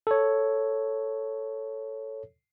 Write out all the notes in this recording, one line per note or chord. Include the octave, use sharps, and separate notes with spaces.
A4 C#5